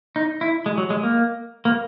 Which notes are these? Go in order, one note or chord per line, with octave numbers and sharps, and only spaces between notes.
D#4
E4
G#3
F#3
G#3
A#3
A#3